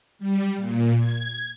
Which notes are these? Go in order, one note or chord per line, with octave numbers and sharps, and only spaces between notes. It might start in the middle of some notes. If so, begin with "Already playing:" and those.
G3
A#2
G#6